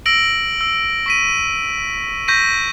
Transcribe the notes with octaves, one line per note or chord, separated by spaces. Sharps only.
E6 A#6 D7 F#7
E6
C#6 B6 D#7
C#6 G6 A#6 B6 D#7